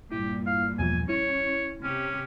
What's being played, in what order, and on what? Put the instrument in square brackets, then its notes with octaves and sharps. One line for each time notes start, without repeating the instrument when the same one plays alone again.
[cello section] G2 A#2 [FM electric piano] E4 [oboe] G4
[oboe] F5
[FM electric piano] E2 B2 F3 [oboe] G#5
[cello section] C#4 [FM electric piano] E4 [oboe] C#5
[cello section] C3 G4 [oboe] C#4